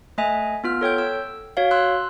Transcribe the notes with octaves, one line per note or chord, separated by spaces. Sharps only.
A3 D#5 E5 G#5
B3 F4 F6
A4 C#5 G5 G6
E6
F#4 C#5 F5
C6 E6 F#6